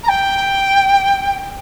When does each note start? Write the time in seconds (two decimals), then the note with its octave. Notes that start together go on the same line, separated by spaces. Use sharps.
0.03 A#5
0.08 G5